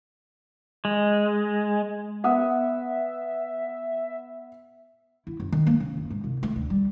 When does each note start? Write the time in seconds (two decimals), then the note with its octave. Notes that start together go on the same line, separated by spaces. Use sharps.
0.85 G#3
2.24 B3 E5 F#5 D#6
5.27 E4
5.40 F#2
5.52 D#3
5.67 A#3
5.80 C#3
5.97 F#1
6.10 G#2
6.24 C2
6.43 A3
6.55 D2
6.70 G3